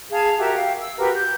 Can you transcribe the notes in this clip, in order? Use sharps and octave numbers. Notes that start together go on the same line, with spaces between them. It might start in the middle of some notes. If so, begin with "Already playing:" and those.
G#4 F5 A5 G#6
F#4 G4 A#4 E5
F5 G5
E6
F#4 G4 A#4 B4
G6